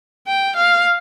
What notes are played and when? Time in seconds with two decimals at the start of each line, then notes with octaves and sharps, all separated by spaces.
0.27 G5
0.57 F5